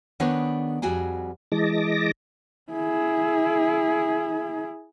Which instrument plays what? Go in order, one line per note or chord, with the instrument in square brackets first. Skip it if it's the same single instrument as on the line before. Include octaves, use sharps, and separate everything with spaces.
[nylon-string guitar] D#3 B3 D4 G#4 B4 C#5
F2 G3 F#4 G#4 G5
[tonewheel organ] E3 G#3 D#5 A5 D6 A#6
[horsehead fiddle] E4 G#4